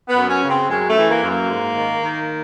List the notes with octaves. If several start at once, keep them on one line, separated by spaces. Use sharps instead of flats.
B3
F#2
C#4
C#3
C4
F#2 G#3
A3
E3
A#3
F#2
A#3
G#2
D#3
D#3